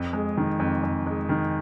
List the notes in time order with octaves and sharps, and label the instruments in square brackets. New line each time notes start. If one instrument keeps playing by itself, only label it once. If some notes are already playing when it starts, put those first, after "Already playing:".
Already playing: [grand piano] F2
G#3
D#3
F2
F2
G#3
D#3